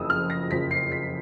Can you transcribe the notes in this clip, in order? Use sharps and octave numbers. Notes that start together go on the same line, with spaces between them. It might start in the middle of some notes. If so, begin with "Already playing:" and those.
Already playing: F#1 F2 C#3 F3 D#6 E6
F6
A#6
F#1 F2 C#3 F3 B6
C7
B6